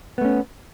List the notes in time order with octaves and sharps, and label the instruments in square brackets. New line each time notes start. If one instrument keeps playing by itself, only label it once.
[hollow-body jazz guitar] B3
A3
C#4